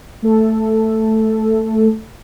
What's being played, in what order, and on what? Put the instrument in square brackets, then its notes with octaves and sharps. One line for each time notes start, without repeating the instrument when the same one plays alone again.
[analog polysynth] A3 A4